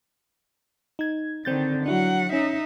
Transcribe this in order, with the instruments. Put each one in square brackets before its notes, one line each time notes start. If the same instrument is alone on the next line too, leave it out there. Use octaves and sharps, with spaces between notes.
[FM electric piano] D#4 G#6
[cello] D3 D#3 [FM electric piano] C4 G6 A6
[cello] F#3 F#5 [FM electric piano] D4 E4 F#4
[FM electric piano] C#4 [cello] D#4 E5